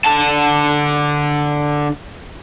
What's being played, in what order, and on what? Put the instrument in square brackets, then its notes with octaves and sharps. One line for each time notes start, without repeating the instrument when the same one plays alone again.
[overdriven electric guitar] D3 A5